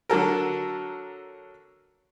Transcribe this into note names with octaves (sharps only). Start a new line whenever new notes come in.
D3 F#3 A4 A#4